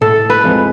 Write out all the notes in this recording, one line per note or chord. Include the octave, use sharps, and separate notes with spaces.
A2 A4
B4
F3 G#3 C4